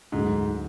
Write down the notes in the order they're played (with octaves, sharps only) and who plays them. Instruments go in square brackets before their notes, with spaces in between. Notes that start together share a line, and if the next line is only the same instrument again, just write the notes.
[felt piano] D2 D3 F#3 [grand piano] G#2